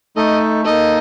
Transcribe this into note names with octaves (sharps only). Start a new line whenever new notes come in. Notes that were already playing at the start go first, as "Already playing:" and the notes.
A3 D#4 A4 D#5
A#3 D#4 A4 D#5